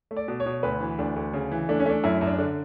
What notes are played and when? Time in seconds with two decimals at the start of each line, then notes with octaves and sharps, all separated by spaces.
0.11 A3
0.16 D5
0.28 B2
0.40 C#5
0.46 B2
0.63 D2 B4
0.81 E3
0.99 D2 D4
1.16 D2
1.33 C#3
1.52 E3
1.69 A3 D4
1.79 C#4
1.86 A3 D4
2.04 F#2 E4
2.21 F#2
2.27 D4
2.38 D3